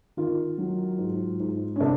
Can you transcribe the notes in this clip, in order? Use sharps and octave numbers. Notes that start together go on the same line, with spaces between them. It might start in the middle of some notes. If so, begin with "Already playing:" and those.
D#3 F4
F#3
G#2
G#2
C#4
C3 D4